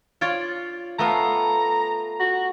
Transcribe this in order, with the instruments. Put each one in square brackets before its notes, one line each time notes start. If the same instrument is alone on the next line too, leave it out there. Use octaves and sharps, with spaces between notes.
[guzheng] F4 C#5 D5
[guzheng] A3 B3 F5 [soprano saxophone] A#5
[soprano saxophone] F#4